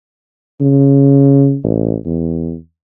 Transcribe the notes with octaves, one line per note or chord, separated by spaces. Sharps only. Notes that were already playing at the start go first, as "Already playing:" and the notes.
C#3
A1
E2